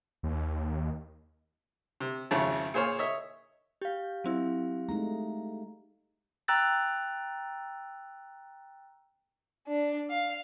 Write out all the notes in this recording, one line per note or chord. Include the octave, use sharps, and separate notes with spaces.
D#2
C3
G#1 F2 C#3 E4 C#5 A5
A#2 G#4 C5 C#5 F5
C#5 D#5 E5
G4 F5 G6
F#3 C4 E4
G#3 A3 D#4 A#5
G5 A#5 E6 F#6 A6
D4
F5